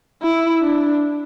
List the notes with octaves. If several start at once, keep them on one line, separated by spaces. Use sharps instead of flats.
E4
D4